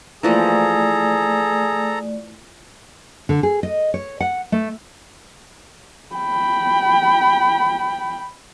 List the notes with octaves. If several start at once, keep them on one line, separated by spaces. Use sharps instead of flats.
E3 F3 A3 A#3 G#4 A4 D5 A#5
D3
G#4
D#5
C#5
F#5
A3
G5 B5